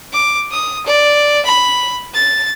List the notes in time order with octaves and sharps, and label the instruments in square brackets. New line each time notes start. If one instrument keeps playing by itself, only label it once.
[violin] D6
D#6
D5
B5
A6